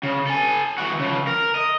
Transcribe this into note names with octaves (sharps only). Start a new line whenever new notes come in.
C#3
A4 G#5
E3 F#4
C#3 F3
A#4
D#5